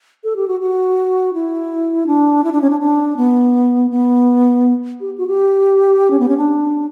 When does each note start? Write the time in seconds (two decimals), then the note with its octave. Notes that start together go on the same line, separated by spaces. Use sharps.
0.24 A4
0.36 G4
0.48 F#4
0.61 F#4
1.34 E4
2.07 D4
2.44 E4
2.52 D4
2.61 C#4
2.70 D4
2.80 D4
3.17 B3
3.91 B3
5.00 G4
5.18 F#4
5.28 G4
6.11 C#4
6.19 B3
6.28 C#4
6.37 D4